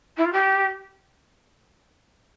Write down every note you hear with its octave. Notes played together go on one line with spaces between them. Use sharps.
E4
F4
G4